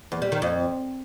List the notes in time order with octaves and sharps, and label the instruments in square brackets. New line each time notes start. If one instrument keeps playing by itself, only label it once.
[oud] E2
G3
D#3
F2